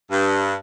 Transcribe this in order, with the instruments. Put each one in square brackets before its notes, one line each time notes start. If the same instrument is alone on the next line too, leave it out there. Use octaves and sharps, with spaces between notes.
[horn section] G2